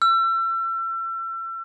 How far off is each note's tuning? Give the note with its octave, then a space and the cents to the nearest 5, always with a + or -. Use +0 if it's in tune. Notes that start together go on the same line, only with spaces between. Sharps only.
E6 +35